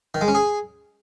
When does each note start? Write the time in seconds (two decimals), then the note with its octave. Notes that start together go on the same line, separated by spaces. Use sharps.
0.14 D#3
0.21 G#3
0.28 C#4
0.35 G#4